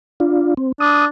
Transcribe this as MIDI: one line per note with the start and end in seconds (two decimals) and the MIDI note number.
0.20 0.54 62
0.20 0.54 65
0.57 0.72 60
0.80 1.06 62
0.80 1.06 87